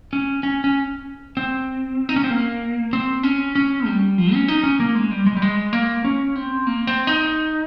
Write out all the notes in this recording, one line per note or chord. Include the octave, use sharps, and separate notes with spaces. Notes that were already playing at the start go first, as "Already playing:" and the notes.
C#4
C#4
C#4
C4
D#4
C#4
C4
A#3
C4
C#4
C#4
G3
F3
C#4
D#4
C#4
A#3
G#3
G3
G#3
G3
G#3
A#3
C#4
C4
A#3
C4
D#4